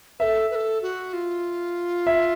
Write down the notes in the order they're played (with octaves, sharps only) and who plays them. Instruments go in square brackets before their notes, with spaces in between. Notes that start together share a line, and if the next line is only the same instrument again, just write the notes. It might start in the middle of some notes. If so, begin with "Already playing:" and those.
[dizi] A4 B4 [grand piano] E5
[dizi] B4
A4
F#4
F4
[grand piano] E5